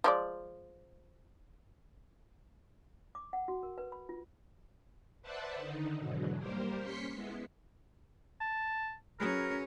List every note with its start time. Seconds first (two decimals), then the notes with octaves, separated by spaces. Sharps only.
0.04 F3 G#3 D5
3.15 D6
3.33 F#5
3.48 F#4
3.63 A#4
3.78 B4
3.92 B5
4.09 F4
5.22 B4 C5 D5 E5 F#5 A5
5.55 D3 D#3 D#4
5.99 E2 G#2 B2 D3 F#3
6.37 G3 A#3 G4 A#4 C5
6.81 C#4 C6 B6 C#7
7.12 G#3 B3 E4
8.41 A5
9.20 F#3 C#4 G#4 A#4 B4